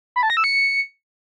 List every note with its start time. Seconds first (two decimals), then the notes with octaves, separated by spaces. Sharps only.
0.16 B5
0.23 A5
0.30 A#6
0.37 E6
0.44 C#7